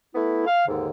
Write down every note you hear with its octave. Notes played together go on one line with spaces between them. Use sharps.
A3 B3 E4
F5
D#2 G#2 D3